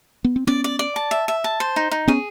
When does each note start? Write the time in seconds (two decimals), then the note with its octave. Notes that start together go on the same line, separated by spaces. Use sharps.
0.24 B3
0.36 C4
0.47 B3 C#4 D5
0.64 D5
0.79 D5
0.96 A5
1.11 E5
1.28 E5
1.44 A5
1.60 C5
1.76 D#4
1.91 D#4
2.08 B3 C#4 G#4